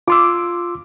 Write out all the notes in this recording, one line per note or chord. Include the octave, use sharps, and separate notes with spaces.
F4 C6 D6 E6